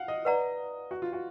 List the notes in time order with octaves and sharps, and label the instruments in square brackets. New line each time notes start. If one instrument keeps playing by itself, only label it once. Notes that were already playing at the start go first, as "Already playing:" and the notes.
Already playing: [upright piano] F5 F#5
D#5
[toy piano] B4 D5 F#5 A#5
[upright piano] F#4
F4
F#4